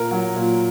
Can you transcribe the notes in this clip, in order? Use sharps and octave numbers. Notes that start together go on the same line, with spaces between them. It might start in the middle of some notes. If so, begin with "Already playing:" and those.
Already playing: A#2 A#4
F#3
A#2